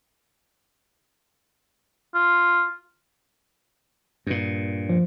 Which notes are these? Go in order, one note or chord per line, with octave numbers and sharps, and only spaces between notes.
F4
G2 A#2
F3